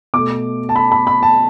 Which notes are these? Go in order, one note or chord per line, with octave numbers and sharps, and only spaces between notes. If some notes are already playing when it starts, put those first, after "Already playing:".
B2 A3 D6
A5
B5
B5
B5
A5